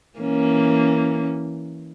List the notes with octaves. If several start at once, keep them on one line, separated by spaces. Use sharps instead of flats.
E3 A#3 C#4